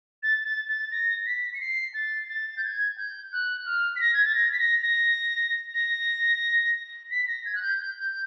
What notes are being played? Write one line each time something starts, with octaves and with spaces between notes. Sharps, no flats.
A6
A6
A6
A#6
B6
C#7
C7
A6
A6
G6
G#6
G6
F#6
F6
B6
A#6
G#6
A6
A#6
B6
A#6
A#6
A#6
B6
A#6
G#6
F#6
G6
G6